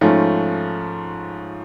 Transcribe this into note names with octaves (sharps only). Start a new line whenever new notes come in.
G#2 F3 A3 C#4